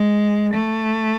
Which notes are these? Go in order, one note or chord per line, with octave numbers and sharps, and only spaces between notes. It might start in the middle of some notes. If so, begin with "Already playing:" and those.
Already playing: G#3
A3